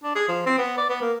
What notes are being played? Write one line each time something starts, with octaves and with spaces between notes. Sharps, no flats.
D4
G#4
F3
C4
B3
D5
B3
A#3